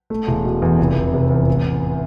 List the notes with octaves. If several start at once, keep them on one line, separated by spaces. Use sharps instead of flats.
A3
E1
B2
E2
F1
F1
C3
E2
A1